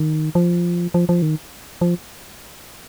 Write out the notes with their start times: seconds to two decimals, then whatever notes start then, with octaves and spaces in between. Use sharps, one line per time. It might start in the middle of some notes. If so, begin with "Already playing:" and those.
Already playing: D#3
0.35 F3
0.94 F3
1.09 F3
1.22 D#3
1.81 F3